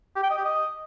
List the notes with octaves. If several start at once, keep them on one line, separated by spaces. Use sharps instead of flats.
G4
G5
D#5
G4
D#5